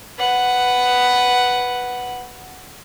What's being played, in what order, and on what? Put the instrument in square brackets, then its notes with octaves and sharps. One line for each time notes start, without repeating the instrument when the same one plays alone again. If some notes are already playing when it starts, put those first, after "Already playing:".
[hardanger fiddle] B4 F#5